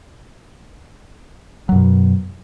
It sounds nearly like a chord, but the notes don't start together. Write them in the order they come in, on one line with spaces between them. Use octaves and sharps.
F#3 F#2 B2